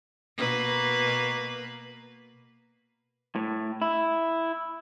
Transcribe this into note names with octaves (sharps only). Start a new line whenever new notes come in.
B2 A#3 B4
A2
E4